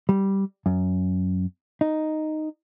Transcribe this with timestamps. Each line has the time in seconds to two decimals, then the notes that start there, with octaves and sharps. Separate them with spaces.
0.09 G3
0.66 F#2
1.81 D#4